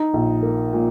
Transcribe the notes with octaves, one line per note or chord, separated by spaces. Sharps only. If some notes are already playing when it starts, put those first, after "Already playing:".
Already playing: D#4
A#1
A#3
A#2